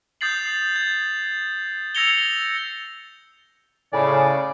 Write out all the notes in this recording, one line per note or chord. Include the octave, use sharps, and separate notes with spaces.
D#6 G6 A6 C7 F#7
G#6
E6 G#6 A#6 C#7 F7 G7
A2 C#3 D5 G#5 B5